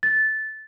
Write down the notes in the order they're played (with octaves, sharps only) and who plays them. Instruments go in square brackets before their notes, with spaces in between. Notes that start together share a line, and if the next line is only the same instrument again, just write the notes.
[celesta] A6